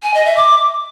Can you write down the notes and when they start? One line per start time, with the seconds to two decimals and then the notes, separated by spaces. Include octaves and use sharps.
0.03 G#5
0.14 D#5
0.25 E5
0.37 D6